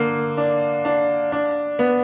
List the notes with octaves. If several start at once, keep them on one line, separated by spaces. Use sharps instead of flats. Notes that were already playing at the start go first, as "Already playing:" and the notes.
Already playing: D3 A#3
D4
D4
D4
B3